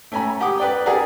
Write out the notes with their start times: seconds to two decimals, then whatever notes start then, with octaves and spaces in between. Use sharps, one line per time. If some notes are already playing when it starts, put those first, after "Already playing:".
0.12 A3 C#4 G#5 A#5 B5
0.40 G4 F#5 D6 D#6
0.58 B4 D5 G5
0.86 G#4 A#4 D5 F#5 G#5 A#5